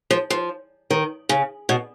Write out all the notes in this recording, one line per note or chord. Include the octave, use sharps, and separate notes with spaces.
F3
F3
D#3
C#3
B2